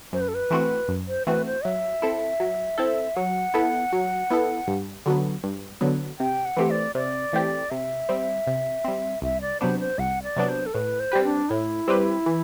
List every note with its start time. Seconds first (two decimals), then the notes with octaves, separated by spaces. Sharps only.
0.13 F#2 C5
0.21 B4
0.28 A4
0.34 B4
0.50 E3 A3 C4 F#4
0.88 F#2
1.08 C5
1.26 E3 A3 C4 F#4 B4
1.46 C5
1.64 F#3 E5
2.02 C4 E4 A4
2.40 F#3
2.78 C4 E4 A4
3.16 F#3 F#5
3.54 B3 E4 A4
3.92 F#3
4.30 B3 E4 A4
4.68 G2
5.06 D3 F#3 B3
5.44 G2
5.81 D3 F#3 B3
6.19 C3 G5
6.45 F#5
6.57 E3 A3 C4 G4
6.70 D5
6.95 C3 D5
7.33 E3 A3 C4 G4
7.70 C3 E5
8.09 G3 C4
8.47 C3
8.84 G3 C4
9.22 C2 E5
9.41 D5
9.61 C3 F#3 B3 D4 C5
9.80 C5
9.98 C2 F#5
10.23 D5
10.36 C3 F#3 B3 D4
10.49 C5
10.66 A4
10.74 A2 B4
11.00 C5
11.12 G3 C4 G4 B4
11.24 D4
11.49 A2 E4
11.88 G3 C4 G4 B4
12.26 E3